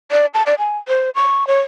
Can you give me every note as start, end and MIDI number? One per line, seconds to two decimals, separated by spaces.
0.11 0.26 74
0.34 0.43 81
0.46 0.55 74
0.59 0.78 80
0.88 1.10 72
1.15 1.47 85
1.47 1.60 73